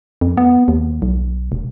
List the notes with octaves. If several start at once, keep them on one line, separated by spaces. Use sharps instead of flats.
F2
B3
D#2
B1
E1